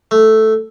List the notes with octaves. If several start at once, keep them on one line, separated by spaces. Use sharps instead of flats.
A3